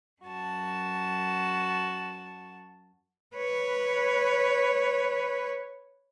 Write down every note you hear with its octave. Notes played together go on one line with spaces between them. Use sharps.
F#2 F#4 A5
B4 C#5